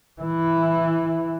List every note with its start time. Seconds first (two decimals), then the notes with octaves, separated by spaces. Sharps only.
0.21 E3 E4